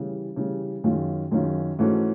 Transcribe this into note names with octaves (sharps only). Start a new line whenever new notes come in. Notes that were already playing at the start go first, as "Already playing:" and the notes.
Already playing: C#3 E3 G3
C#3 E3 G3
F#2 D#3 G#3 C#4 F4
F#2 D#3 G#3 C#4 F4
G#2 E3 A3 C#4 F#4